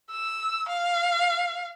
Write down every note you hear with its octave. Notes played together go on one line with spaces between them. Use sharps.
E6
F5